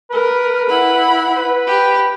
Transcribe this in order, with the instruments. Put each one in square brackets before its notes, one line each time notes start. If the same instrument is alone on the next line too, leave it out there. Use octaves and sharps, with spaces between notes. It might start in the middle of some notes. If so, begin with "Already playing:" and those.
[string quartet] A#4 [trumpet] B4
[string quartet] E4 F#5 B5
[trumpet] B4
[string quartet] G4